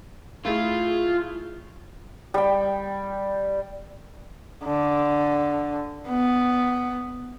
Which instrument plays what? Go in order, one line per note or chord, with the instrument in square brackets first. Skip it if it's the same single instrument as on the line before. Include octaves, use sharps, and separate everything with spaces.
[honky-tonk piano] A3 E4 G#4 [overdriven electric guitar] F4
[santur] G3 G5
[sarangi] D3
B3